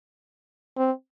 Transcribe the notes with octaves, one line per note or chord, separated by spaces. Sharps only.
C4